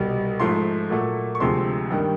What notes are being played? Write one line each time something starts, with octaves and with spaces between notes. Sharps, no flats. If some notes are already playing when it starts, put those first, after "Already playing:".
Already playing: C2 B2 G3
G#2 F3 A3 C6
A#2 F#3 A3
C#6
D2 C3 F3 G#3 C6
G2 D#3 G3